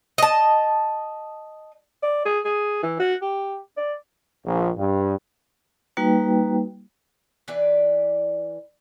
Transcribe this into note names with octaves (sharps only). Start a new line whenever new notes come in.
D#5 A5
D5
G#4
G#4
E3
F#4
G4
D5
A#1
G2
G3 A#3 D#4 F#4 B4 G5
E3 D4 B4 D5